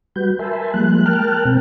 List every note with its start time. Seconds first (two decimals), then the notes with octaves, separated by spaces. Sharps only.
0.16 G3 F#4 B4 G6
0.39 A#4 E5 G#5 A5 B5 C6
0.74 F3 G3 G#3 A#3 F#6
1.06 A#4 G5 A5 F6 F#6
1.45 B2 C4